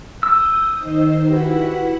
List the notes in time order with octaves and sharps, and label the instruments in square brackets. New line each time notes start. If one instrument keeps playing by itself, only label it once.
[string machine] D#6 G6 [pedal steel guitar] E6
[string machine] D#3 D#4 C5
[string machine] E4 F#5 B6 [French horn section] F#4 G4 B4